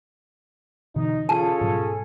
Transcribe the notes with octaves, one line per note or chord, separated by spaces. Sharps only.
B2 D3 E3 D#4
C#4 F4 G#4 A4 A5
G#2 B2 F#3